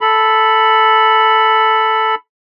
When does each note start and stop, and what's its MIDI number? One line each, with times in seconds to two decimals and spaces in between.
0.01 2.15 69
0.01 2.15 83